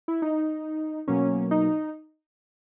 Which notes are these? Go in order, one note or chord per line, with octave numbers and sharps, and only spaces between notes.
E4
D#4
B2 F#3 A#3 C#4
D#4